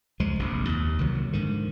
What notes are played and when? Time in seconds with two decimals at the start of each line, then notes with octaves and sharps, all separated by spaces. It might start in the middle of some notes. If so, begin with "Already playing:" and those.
0.20 C#2 F3 G#3
0.39 F1 A#1 C3
0.69 D#2
0.99 C2 D#3 F3 F#3
1.32 G#2 D3 D#3 F3